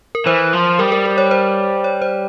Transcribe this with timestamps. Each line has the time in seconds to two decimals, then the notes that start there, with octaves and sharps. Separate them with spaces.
0.15 A#4
0.26 E3 C5
0.53 F3
0.79 G3 A#4
0.92 A#4
1.05 A#4
1.18 C#5
1.31 C5
1.84 C#5
2.02 C5